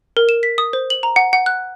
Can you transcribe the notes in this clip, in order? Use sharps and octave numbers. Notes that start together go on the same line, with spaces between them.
A#4
E7
B6
D#6
C5
F#7
A#5
F#5
F#5
F#6